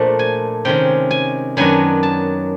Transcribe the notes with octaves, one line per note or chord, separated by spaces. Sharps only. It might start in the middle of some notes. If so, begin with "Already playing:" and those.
Already playing: A#2 F3 A3 D4 A5
G#5
C3 D#3 G#3 C#4 G5
G#5
F#2 D#3 F#3 B3 D4 G#5
A5